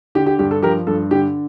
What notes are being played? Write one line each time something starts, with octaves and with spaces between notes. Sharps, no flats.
D3 G4
G4
G2 G4
A4
F3 G4 A#4
G2 A4
D3 G4